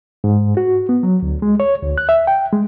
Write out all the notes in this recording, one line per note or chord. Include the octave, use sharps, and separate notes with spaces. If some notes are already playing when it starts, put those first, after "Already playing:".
G#2
F#4
B3
F#3
D2
G#3
C#5
D2
F#6
E5
G5
G#3